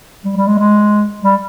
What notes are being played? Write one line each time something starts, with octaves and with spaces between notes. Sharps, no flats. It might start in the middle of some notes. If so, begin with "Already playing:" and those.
G3
G3
G#3
G#3
G3